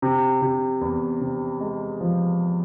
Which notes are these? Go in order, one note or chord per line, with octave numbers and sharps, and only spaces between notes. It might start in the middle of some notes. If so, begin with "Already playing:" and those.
C3
C3
E2
C3
G#3
F3